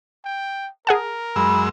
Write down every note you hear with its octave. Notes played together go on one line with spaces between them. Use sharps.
G5
G#4 A#4 F#5 A5
F#2 G#3 B5 E6